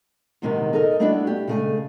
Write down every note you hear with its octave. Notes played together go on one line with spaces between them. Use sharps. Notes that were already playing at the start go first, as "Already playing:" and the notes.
E2 G#2 C3 D#3 F#3 B3
D#4 A4 A#4 D#5
G3 A3 B3 D4 E4 F#4
G4
C#3 G#3 A3 C#5 G#5